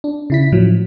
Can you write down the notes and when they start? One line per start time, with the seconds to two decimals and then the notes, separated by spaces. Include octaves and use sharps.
0.04 D4
0.30 C#3 E4 B6
0.52 A2 F3 F#3